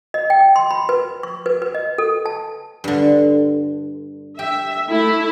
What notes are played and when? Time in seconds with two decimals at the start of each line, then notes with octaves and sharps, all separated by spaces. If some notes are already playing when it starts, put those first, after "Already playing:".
0.14 D#5
0.30 G5
0.56 C6
0.71 B5
0.89 B4
1.23 C#6
1.46 B4
1.62 B4
1.75 D#5
1.98 A4
2.26 A5
2.84 G2 D3
4.39 G4 E5
4.88 A3 E4